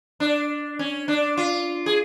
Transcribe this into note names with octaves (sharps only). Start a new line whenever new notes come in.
D4
C#4
D4
F4
G#4